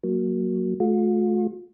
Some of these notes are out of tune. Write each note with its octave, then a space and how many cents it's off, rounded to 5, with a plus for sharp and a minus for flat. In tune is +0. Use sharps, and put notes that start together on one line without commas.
F#3 +0 A#3 +0
A3 -40 F4 +45